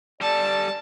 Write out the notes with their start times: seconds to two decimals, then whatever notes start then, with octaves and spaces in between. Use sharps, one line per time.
0.21 G3 A4 D5 A5